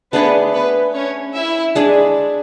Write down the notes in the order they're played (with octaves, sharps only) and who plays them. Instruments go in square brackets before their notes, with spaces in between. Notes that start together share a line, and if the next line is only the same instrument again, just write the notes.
[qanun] A3 D4 G#4 D5 [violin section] B3 B4
[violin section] B3 B4
C#4 C#5
E4 E5
[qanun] G#3 D4 G#4 D5